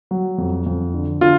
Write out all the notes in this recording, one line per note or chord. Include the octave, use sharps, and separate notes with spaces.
F#3
F2
F2
D3
D3 F4